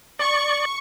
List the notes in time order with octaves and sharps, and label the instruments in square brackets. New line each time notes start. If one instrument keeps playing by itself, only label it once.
[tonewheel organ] D5 [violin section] C#6